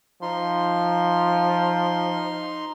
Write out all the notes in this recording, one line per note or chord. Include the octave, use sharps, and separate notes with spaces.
F3 D#4 C6